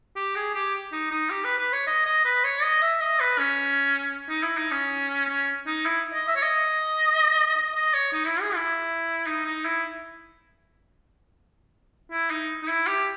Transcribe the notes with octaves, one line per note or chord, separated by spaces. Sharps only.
G4
G#4
G4
D#4
D#4
G4
B4
B4
C#5
D#5
D#5
B4
C#5
D#5
E5
D#5
B4
C#4
D#4
E4
D#4
C#4
C#4
D#4
E4
D#5
E5
C#5
D#5
D#5
D#5
C#5
D#4
E4
G#4
E4
D#4
D#4
E4
E4
D#4
D#4
E4
G4